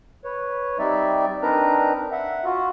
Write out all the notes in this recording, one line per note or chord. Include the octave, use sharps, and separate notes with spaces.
B4 C#5
G3 C4 D#4 D5 E5
C4 D4 D#4 A#4 B4 A#5
E5 F#5
F4 F#4